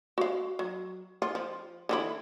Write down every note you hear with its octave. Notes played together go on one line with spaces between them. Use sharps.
F#4 F5
F#3
F4
F3
D3 E3 E4